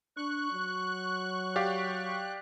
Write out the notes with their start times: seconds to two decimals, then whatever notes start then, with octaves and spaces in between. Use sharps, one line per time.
0.17 D4 C#6 F#6
0.51 F#3
1.56 G4 D5 F5